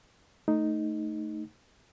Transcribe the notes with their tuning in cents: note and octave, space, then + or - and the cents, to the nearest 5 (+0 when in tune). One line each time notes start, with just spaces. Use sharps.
A3 +0 D#4 +0